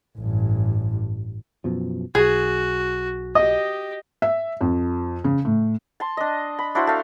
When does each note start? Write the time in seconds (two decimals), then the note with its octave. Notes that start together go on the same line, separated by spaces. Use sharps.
0.18 A1 G2
1.64 F#2 B2 F3
2.15 B1 F#4 G#4
3.35 G4 D#5
4.22 E5
4.61 F2
5.24 C#3
5.45 A2
6.00 A5 C6
6.17 D4 D#5
6.59 B5
6.75 D4 E4 F#4 C5
6.87 A3 F5